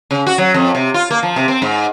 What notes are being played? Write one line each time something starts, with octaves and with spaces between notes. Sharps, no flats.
C#3
F#4
F#3
F2
C3
F4
A#3
F3
C3
C4
G#2